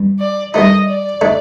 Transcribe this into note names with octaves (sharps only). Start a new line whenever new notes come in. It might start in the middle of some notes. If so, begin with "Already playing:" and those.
Already playing: G2
D5
G2 D#3 A3 D#4 D#5
D5
D3 A3 D#4